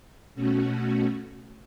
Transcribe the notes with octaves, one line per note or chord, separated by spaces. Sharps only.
B2 A3 C#4 F#4